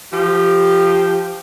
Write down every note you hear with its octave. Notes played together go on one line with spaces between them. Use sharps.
F3 G4